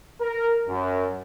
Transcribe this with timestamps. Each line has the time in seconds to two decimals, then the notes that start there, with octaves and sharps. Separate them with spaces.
0.20 A#4
0.68 F#2